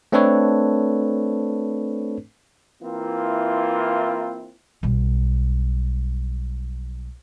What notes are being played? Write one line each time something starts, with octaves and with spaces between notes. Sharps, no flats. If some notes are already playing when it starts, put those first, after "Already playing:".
A3 C4 D4 A4 B4 C#5
E3 A#3 C4 E4 F4
B1 G3